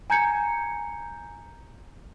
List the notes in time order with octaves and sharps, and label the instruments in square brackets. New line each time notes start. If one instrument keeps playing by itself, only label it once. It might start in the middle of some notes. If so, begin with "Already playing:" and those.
[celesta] G#5 A#5 G6 G#6 C#7